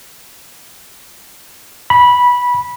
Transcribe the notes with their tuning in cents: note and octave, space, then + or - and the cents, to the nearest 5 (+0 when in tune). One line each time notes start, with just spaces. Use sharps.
B5 -15